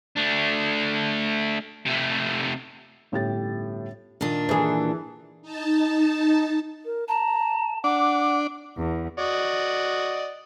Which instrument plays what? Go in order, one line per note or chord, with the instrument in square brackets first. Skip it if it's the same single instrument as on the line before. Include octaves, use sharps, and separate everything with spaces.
[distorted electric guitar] A3 D4
C3 A3
[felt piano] G1 A2 C#4 G4 G5 A6
[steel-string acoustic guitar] A#2 D#3 D4
[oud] E3 G#4
[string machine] D#4 A5
[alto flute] A#4
[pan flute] A5 [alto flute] A#5
[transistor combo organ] D4 [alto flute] F#5 [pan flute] D6
[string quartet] E2
[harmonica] F#4 D5 D#5